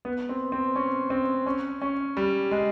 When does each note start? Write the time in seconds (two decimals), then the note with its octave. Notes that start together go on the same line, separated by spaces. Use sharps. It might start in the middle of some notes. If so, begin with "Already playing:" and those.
0.05 B3
0.29 C4
0.52 C4
0.76 C#4
1.10 C4
1.46 C#4
1.82 C#4
2.17 G3
2.51 G#3